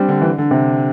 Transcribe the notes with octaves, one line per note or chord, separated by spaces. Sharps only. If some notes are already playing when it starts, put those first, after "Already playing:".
Already playing: G3 C4 D4
D3
E3
D3
D3
C3